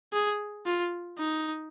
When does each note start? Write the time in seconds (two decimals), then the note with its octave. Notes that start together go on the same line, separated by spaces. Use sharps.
0.13 G#4
0.66 F4
1.18 D#4